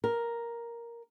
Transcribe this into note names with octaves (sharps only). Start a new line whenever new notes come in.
A#4